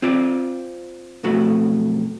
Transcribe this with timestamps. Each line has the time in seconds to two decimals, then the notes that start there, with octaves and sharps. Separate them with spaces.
0.02 C4 F4 D5
1.23 B1 F2 A3 F#4